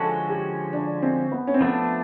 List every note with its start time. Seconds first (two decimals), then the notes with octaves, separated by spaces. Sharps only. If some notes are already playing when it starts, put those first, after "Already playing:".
Already playing: D3 F3 G#3 C#4 F#4 A4
0.29 G4
0.73 D4
1.02 C4
1.32 B3
1.47 C#4
1.54 C4
1.61 F3 A3 B3 D4